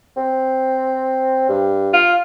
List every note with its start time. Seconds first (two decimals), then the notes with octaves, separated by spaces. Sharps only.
0.17 C4
1.49 G2
1.93 F4